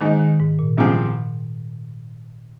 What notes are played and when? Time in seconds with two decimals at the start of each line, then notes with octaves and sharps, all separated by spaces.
0.01 G#2 D#3 G#3 D#4
0.19 D#3
0.40 G#2
0.59 A#2
0.77 C2 C3 F3 C4 G#4